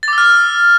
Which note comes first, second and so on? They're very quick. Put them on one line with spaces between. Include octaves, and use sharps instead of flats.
A6 D6 E6 F6